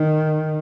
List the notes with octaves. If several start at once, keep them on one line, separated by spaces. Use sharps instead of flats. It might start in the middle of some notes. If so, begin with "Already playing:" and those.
Already playing: D#3